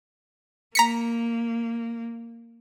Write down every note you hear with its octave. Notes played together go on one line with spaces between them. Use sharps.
A#3 A#5 B6 C#7